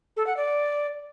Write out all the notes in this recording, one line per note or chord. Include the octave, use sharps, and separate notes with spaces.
A4
F#5
D5